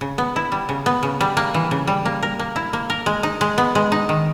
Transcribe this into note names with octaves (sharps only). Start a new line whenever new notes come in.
C#3
B3
E4
G3
C#3
B3
C#3
G3
A#3
E3
C#3
G3
A#3
A#4
A#3
E4
A#3
A#4
G#3
D#4
G#3
B3
G#3
D#4
D#3